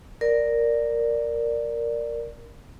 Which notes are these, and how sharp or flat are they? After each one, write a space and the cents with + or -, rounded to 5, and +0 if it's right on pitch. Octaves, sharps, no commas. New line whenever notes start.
A#4 +0 D5 +0